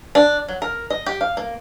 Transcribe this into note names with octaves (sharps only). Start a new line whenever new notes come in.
D4
F#3
A#4
D#5
G4
F5
A#3